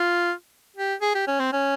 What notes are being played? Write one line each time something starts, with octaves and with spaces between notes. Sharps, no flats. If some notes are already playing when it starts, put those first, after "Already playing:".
Already playing: F4
G4
G#4
G4
C#4
C4
C#4